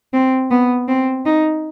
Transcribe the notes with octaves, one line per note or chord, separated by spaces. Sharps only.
C4
B3
C4
D#4